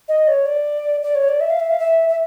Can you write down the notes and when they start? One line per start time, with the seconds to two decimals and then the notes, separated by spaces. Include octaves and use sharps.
0.08 D#5
0.27 C#5
0.46 D5
1.03 D5
1.15 C#5
1.28 D5
1.40 E5
1.50 F5
1.59 E5
1.70 F5
1.79 E5
2.08 E5